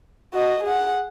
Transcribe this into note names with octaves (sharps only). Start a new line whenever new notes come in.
F#4 D#5
G#4 F#5